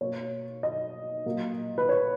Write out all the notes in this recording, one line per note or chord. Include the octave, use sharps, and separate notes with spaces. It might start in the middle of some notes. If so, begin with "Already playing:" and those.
B2 A#3 C#5
D#5
A#2 F#3 A#3
B4
C#5